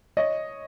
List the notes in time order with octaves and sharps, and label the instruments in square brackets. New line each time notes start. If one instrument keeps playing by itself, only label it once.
[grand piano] C#5 D#5